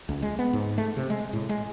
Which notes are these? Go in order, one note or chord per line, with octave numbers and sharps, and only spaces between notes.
C#2
G#3
B3
G#2
A3
C3
G#3
A2
G#3